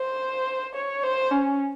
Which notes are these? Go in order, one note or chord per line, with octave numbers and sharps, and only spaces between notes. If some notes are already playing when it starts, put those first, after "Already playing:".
Already playing: C5
C#5
C5
C#4